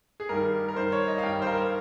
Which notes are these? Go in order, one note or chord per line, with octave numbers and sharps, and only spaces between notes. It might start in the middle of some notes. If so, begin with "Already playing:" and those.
G#4
G2 D#3 G3 A#4
A#4
G2 D#3 G3 C5
C#5
D#5
F5
G2 D#3 G3 G5
C5
A#4